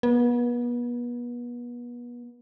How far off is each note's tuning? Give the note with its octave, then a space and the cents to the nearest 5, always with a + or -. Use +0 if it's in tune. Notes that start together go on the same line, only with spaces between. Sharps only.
B3 -35